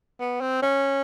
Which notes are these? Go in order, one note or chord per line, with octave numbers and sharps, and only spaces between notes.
B3
C4
C#4